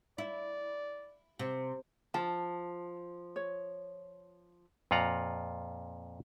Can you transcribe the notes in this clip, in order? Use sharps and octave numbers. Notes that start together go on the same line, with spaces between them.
E4 D5
C3
F3 A5
C#5
F2 A#2 F4 F#5 A#5